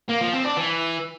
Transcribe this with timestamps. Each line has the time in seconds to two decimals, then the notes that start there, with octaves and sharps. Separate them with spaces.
0.09 A#3
0.21 F3
0.33 C4
0.45 D4
0.57 E3